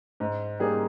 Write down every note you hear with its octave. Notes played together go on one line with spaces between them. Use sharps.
G#2
G3 A#3 D#4 G#4